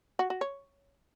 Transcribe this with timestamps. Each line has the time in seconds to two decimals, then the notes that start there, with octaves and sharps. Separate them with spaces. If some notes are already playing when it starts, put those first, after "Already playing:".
0.19 F#4
0.30 F#4
0.41 C#5